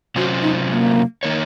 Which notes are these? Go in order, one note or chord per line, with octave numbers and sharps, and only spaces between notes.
C3 F#3 C#4 F4 F#4 C5
D#4
A#3
D#3 A#3 D#4 A#4 C#5